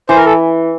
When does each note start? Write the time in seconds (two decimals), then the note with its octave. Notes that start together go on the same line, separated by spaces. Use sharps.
0.09 E3 C5
0.17 A#4
0.25 A4